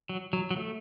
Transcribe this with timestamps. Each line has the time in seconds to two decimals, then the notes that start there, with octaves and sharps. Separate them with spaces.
0.09 F#3
0.33 F#3
0.51 F#3
0.57 A3